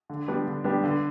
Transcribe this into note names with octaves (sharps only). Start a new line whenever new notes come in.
D3
G3 B3 D4 G4
D3
G3 B3 D4 G4
D3